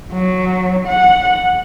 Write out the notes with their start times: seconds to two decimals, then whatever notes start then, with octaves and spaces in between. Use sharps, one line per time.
0.13 F#3
0.87 F#5